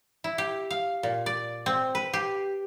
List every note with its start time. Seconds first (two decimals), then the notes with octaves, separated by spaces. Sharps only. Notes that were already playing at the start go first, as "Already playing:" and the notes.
0.24 E4
0.38 G4
0.71 F5
1.03 A#2
1.26 D5
1.66 C4
1.95 B4
2.13 G4